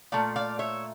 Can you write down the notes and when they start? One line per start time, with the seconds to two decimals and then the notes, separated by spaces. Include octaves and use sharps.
0.12 A#2 A3 D5 F5
0.36 D5 F5
0.59 C#5 E5